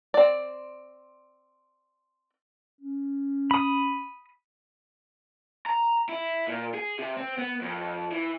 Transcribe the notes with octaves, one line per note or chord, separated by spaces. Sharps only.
C4 D5
C#4
B5 D#6
A#5
E4
A#2
G#4
C3
C4
B3
F2
E3